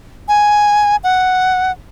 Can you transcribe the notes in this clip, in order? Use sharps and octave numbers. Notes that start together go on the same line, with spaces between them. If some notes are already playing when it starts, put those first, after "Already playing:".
G#5
F#5